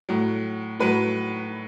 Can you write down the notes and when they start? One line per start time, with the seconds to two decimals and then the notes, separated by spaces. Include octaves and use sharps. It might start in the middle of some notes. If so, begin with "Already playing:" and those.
0.09 A2 F#3
0.79 A2 F#3 B4